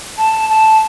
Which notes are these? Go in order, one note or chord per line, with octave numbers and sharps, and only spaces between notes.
A5
A5